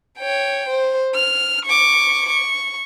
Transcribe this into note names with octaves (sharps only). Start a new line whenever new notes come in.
C#5 G5
C5
F6
C#6 D6
C#6